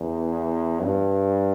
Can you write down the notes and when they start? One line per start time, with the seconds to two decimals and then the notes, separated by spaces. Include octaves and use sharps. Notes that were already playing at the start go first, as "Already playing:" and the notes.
Already playing: E2
0.82 G2